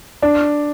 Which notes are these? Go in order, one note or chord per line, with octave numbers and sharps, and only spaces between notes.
D4